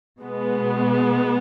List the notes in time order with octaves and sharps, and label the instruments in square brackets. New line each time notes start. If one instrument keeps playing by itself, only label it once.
[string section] B2 G#3 B3